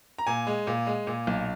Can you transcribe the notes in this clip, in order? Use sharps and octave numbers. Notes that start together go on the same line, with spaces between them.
A#5
A#2 G#5
G#3
A#2
G#3
A#2
B1